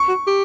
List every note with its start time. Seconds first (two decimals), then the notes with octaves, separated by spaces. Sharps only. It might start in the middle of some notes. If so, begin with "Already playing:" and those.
Already playing: C#6
0.08 F#4
0.27 G4